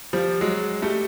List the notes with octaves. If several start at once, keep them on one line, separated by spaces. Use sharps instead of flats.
F3 G3
F#3 G#3
G3 A3